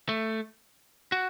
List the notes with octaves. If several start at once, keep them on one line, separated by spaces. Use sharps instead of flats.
A3
F#4